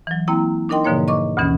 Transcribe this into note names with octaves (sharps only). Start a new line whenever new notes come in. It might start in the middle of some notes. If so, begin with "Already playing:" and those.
E3 F#3
A#3 C4 E4 G5 A#5
D4 D#4 A#4 D#5 G5 C6
G#2 B2 D3 F3 A#3 C#5
D#5 C#6 D6
D2 G2 B2 E3 C#4